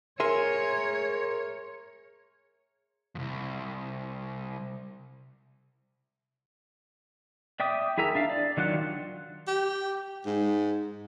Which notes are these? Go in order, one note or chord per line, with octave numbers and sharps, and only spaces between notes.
G#4 A#4 C#5 E5 C6
C2 F2
D5 E5 G5 D6 D#6
E4 G#4 A#4 E5 A#5
D4 E5 F5
D5
D#3 F#3 D4 F4 F#5
G4
G#2